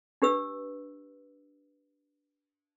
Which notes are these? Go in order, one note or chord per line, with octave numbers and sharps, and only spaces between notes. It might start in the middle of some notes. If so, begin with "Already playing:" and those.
D4 G4 B4 E6